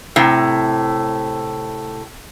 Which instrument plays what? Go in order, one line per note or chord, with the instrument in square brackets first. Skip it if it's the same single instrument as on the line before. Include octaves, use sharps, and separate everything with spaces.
[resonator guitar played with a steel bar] A2 C3